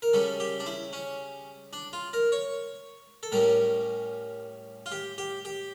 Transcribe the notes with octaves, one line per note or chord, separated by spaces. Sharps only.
A#4
C#3 G3 C#4 A4
G4
D4
E4
C#4
D4
F4
A#4
C#5
A4
A2 G3 C#4 A#4
F4
G4
G4
G4